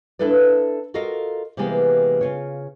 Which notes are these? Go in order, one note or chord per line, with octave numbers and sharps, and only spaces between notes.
D4 E4 A4 B4 D5
F4 F#4 A4 A#4 D#5 F5
C3 E3 G3 G#3 A#3 B3
C#3 F4 C#5